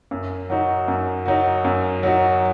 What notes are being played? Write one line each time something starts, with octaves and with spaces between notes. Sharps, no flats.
F#2
F#3 D#4 F#4
F#2
F#3 D#4 F#4
F#2
F#3 D#4 F#4